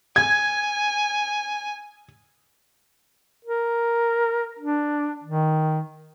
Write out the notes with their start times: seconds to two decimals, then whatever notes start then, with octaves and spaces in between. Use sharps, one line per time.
0.16 G#5 G#6
3.45 A#4
4.59 D4
5.24 D#3